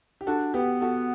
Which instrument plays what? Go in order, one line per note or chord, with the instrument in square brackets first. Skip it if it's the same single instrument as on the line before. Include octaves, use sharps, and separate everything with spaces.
[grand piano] G4
[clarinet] D4 [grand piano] F#4 A4
[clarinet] B3 [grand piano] G4 B4
[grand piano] F#4 A4